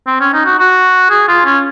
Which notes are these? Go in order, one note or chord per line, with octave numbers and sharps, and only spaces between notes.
C4
C#4
D#4
F#4
F#4
G#4
F4
C#4